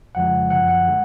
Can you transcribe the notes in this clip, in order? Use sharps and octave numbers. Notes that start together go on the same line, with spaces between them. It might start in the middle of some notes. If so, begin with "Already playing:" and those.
F2 C#3 F3 G#3 F#5
F#2 D3 F3 F#5
F#5
D3 G#3